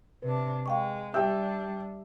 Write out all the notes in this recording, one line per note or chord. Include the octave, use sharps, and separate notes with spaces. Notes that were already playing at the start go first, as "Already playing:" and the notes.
C3 D4 B4
G#3 F5 G5 C#6
G3 D4 G4 E5 G5 E6 G6